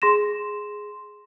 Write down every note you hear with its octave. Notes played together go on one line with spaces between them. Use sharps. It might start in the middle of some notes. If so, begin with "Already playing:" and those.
G#4 C6 A#6 E7